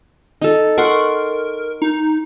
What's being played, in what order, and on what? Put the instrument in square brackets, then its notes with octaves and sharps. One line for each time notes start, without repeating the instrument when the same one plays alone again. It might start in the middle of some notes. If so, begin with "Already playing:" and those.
[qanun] D#4 A4
[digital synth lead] A#4 [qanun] F#5 C6 C#6
[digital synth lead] D#4